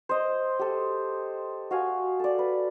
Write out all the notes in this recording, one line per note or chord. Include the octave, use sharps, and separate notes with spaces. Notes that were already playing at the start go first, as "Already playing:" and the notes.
C5 D#5
G4 A4
F#4 F5 G#5
A4 D5
B4